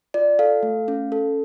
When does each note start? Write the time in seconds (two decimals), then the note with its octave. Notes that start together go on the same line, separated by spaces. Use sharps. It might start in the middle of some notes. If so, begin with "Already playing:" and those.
0.14 F4 D5
0.39 A4 F5
0.63 A3
0.88 C#4
1.12 A4